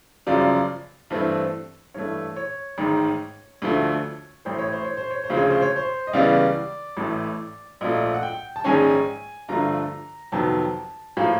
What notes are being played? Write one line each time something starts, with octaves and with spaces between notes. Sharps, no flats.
G1 F#2 C#3 F3 D5
G2 E3 A3 C4
G2 E3 A3 C#5
C#5
A1 G#2 D#3
D2 D3 F3 A3
A1 A2 E3 C5
C#5
C5
C#5
C5
C#5
C5
D2 C#3 F3 G#3
C#5
C5
C#5
C5
D#5
C#2 C#3 E3 G3 B3 D5
A1 A2 E3 A3
A#1 A#2 F3 A3 D#5
F#5
G5
A5
A#1 G#2 D#3 G#3 C#4 G#5
G2 D3 F3 A3 A#5
F2 C3 D#3 F#3 B3 A5
A2 F3 A#3